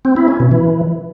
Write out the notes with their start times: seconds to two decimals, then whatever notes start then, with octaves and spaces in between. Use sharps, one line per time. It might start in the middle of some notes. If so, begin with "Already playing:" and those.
0.05 C4
0.16 E4
0.28 C#4
0.40 B2
0.51 E3